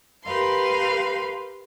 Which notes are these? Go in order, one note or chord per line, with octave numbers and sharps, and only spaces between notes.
G4 A#4 B4 F5 C6